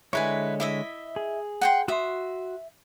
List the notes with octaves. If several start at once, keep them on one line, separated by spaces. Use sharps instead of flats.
D3 G#3 E4 B4 C#5 G#5
E4 D#5 E5
G#4
F#5 G5 C6
F#4 E5 C6 D#6